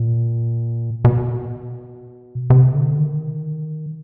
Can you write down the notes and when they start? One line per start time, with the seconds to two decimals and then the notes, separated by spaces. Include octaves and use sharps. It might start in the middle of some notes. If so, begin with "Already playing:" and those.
Already playing: A#2
1.05 B2
2.50 C3
2.74 D3
2.99 D#3